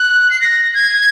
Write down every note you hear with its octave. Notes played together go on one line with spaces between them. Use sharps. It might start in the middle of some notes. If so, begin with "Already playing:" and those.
Already playing: F#6
C7
A#6
G#6